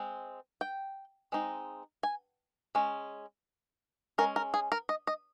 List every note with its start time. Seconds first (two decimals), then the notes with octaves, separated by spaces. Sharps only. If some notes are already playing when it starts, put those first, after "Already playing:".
Already playing: G#3 C4
0.61 G5
1.32 G#3 C4 D#4
2.03 G#5
2.75 G#3 C#4
4.18 G#3 C#4 A#4
4.36 A#4
4.54 G#4
4.72 A#4
4.89 D#5
5.07 D#5